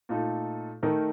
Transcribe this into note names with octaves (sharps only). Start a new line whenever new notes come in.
A#2 A3 D#4 A4
D#3 A3 D#4 A#4